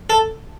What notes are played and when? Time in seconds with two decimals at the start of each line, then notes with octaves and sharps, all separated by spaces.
0.10 A4